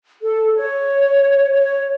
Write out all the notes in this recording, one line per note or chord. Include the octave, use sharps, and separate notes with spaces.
A4
C#5
C#5